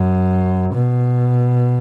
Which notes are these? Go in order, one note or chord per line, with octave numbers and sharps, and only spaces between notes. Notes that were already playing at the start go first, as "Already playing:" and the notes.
Already playing: F#2
B2